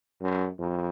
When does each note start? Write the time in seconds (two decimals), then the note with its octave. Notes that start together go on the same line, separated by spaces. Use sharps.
0.22 F#2
0.59 F2